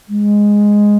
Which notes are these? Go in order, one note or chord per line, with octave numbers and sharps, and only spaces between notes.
G#3